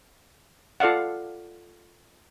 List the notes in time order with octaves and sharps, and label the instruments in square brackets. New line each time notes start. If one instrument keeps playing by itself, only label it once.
[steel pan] F4 A4 D5 F5 F#5